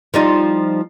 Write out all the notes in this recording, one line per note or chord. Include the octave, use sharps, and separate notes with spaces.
F3 G3 D#4